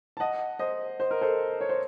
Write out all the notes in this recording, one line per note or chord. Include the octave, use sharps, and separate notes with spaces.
A5
D#5 F#5
C5 D#5
C5
A#4
A4 C5
C#5
C5